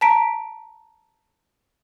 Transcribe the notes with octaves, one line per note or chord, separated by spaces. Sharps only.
A5 A#5 B6 D7